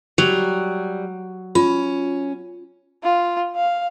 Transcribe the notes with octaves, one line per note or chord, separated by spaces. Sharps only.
F#3 G3
C#4 F4
F4
F5